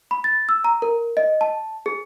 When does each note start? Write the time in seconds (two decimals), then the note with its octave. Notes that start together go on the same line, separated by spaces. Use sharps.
0.11 B5
0.24 A6
0.49 E6
0.64 A#5
0.82 A#4
1.17 D#5
1.41 A5
1.86 G#4